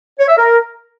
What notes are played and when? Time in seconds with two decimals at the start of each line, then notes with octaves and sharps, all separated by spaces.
0.19 C#5
0.28 E5
0.37 A#4